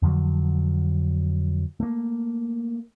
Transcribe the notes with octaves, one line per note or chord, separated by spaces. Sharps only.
F2 D3 F3 F#3
A3 A#3